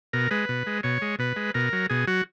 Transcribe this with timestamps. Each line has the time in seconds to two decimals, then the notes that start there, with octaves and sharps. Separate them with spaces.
0.13 B2 A#4
0.31 G#3 B4
0.49 B2
0.67 G#3
0.83 B2 C#5
1.02 G#3
1.19 B2 B4
1.36 G#3
1.54 B2 A#4
1.73 F#3
1.90 B2 G#4
2.07 F#3 F#4